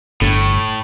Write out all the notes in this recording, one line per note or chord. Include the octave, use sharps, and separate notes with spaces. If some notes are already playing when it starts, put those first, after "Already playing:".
G1 A2